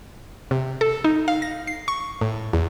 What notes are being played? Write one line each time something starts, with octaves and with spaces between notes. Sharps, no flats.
C3
A4
D#4
F5
A#6
C7
C#6
A2
E2